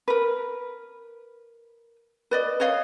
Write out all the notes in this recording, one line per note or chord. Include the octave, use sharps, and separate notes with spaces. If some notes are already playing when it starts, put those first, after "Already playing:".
A#4 B4
B4 D5 D#5
B4 C#5 D#5 F5